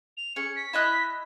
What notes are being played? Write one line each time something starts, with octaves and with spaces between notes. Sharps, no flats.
F7
C#4 G#4 C#7
B6
E4 D#5 F#6